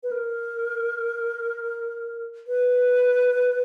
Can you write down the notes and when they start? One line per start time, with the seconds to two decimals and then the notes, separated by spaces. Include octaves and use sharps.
0.03 B4
0.11 A#4
2.47 B4